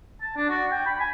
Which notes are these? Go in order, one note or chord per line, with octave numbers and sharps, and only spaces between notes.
A5
D4
F#4
G5
B5
G#5